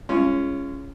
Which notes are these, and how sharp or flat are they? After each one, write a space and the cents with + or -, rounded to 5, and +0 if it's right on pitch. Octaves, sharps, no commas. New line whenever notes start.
G#3 +0 C#4 +0 F4 -35